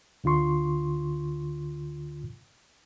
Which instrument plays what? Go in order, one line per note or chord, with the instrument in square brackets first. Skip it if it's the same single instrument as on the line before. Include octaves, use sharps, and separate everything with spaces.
[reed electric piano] D2 D3 F4 C6 C#6